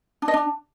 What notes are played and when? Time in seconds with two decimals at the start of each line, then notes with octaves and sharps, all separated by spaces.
0.22 D4
0.28 D#5
0.34 D4